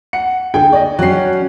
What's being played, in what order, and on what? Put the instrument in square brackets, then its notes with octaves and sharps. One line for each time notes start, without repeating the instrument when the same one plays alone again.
[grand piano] F#5 C#7
[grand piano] D3 G#4 [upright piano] G5
[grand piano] D5 D#5
[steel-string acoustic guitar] F#3 C#4 [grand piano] F#6 C7